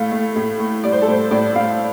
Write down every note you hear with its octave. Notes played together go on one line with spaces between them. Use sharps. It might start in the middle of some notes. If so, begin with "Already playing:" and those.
Already playing: A2 A3 F5
A3
A2
A3
G3 D5
C5
A4
A2 C5
A2 D5
A2 F5